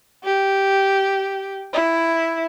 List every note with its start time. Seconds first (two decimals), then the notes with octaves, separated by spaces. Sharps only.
0.24 G4
1.73 E4